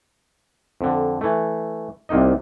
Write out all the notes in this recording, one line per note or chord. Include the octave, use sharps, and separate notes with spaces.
F2 D3
E3 A3
C2 C3 A#3 D#4 D#5